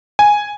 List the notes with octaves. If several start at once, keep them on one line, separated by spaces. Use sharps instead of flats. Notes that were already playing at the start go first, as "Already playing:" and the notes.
G#5